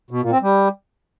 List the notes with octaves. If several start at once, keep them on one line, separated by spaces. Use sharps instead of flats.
B2
A#2
C4
G3